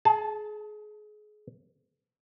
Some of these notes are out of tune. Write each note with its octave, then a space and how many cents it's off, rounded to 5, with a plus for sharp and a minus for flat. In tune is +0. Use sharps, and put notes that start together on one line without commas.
G#4 +30 A5 -10